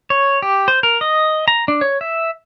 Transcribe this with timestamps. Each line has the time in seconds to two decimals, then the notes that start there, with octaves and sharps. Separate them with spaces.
0.10 C#5
0.42 G4
0.68 C5
0.83 A#4
1.01 D#5
1.48 A#5
1.68 D4
1.81 C#5
2.01 E5